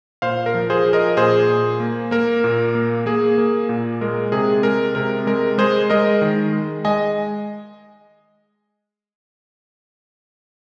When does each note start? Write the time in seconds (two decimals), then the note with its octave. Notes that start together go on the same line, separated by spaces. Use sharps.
0.22 A#2 C5 F5
0.46 A#4
0.54 F3
0.70 G#4 C5
0.86 F3
0.93 A#4 D#5
1.17 A#2 G#4 C5
1.49 A#2
1.80 A#3
2.11 A#3 A#4
2.44 A#2
2.75 A#3
3.06 A#3 G#4
3.38 A#3
3.69 A#2
4.01 G#3 A#4
4.32 C3 G#4
4.63 G#3 A#4
4.95 C3 A#4
5.27 G#3 A#4
5.58 G#3 G#4 C5
5.90 G#3 A#4 D#5
6.22 D#3
6.53 G#3
6.85 G#3 D#5 G#5